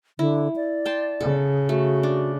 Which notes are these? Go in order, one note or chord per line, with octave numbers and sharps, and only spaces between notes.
D3 E4
D5
G5 A5 C6
C#3 A4
A3 F#4
D4